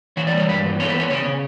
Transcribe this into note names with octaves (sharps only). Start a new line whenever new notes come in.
E3 C#5
D5
G3 C#5
G2 B4
E3
B3 C#5
A4
B4
B3
C#5
C#3 C#5
C#3